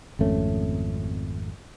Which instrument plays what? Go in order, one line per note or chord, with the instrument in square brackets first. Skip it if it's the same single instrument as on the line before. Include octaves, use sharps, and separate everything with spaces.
[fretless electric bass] G#1 F2 A3 C#4